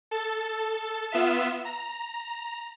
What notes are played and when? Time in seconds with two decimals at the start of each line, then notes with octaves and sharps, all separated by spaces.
0.11 A4 A6
1.11 B3 F4 E5 E7
1.65 A#5